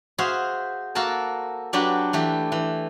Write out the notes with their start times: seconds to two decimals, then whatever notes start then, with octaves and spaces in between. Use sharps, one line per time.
0.18 F#4 G#4 C5 E5 F5
0.95 A#3 F#4 A4 A#4 A5
1.73 F#3 D4 F#4 G4 B4 A5
2.13 E3 A3 G4
2.52 E3